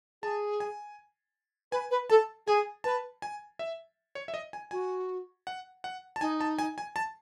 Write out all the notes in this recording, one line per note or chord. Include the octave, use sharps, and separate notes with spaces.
G#4 A5
G#5
B4 G#5
B4
A4 A5
G#4 G#5
B4 A5
G#5
E5
C#5
E5
D#5
G#5
F#4 G#5
F#5
F#5
A5
D#4 G#5
A5
G#5
G#5
A5